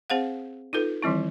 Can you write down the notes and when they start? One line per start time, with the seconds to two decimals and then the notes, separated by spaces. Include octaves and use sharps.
0.10 C4 G#4 C5 F5 F#5
0.73 D#4 F4 A4 B4
1.03 D#3 E3 G3 C4 E4